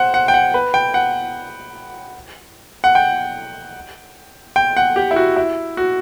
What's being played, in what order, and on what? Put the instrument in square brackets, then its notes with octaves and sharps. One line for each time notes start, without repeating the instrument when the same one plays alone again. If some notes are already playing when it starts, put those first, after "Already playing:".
Already playing: [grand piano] C5 F#5
F#5
G5
F#5
B4
G5
F#5
F#5
G5
G5
F#5
G4
E4
F#4
E4
F#4